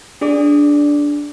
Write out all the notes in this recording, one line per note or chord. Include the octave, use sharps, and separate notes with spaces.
D4 G#4 D5 D6